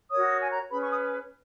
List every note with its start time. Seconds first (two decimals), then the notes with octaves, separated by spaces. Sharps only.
0.10 F#4 A#4 C#5 D#6
0.40 G#5
0.51 A#5
0.70 C#4 G#4 B4 B5
0.80 C#6
0.90 D#6